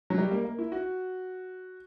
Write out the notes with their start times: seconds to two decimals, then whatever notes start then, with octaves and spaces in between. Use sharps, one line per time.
0.10 F#3
0.18 G3
0.31 A#3
0.45 A#3
0.59 E4
0.72 F#4